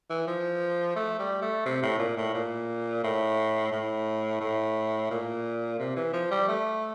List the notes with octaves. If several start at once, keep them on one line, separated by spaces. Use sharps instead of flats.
E3
F3
A3
G3
A3
C3
A2
A#2
A2
A#2
A2
A2
A2
A#2
C3
E3
F3
G3
A3